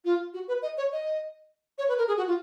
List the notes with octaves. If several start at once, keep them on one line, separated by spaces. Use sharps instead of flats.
F4
F#4
B4
D#5
C#5
D#5
C#5
B4
A#4
G#4
F#4
F4